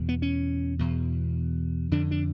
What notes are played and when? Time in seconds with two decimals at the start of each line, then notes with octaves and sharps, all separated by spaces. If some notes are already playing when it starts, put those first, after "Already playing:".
Already playing: E2 B2
0.09 B3
0.22 C#4
0.79 E2 B2
1.91 F2 D3 D4
2.11 D4